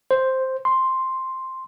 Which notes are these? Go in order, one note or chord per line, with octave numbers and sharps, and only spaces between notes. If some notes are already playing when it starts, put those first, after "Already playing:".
C5
C6